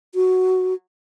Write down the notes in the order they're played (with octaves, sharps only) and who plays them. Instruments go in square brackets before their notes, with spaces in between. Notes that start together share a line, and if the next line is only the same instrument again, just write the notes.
[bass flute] F#4